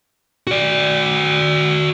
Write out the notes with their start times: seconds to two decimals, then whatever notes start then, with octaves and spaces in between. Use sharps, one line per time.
0.47 F#4 D5